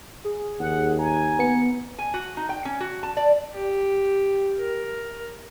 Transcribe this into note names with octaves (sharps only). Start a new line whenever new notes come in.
G#4
D#2 F#5
G#5 A#5
B3 C#7
G#5
F#4
D#4
G5
C#4
F#4
A5
D5
G4
A#4